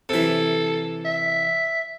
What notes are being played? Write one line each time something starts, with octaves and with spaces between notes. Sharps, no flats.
C3 E3 A4
E5